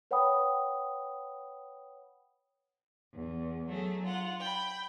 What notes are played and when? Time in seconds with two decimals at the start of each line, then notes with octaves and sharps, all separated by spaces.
0.11 B4 C#5 F#5 G5 B5 D#6
3.14 E2
3.67 F#3 A3 G#4
4.03 F4 F#5
4.40 G5 B5